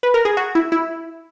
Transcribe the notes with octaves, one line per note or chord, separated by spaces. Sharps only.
B4
A#4
G#4
F#4
E4
E4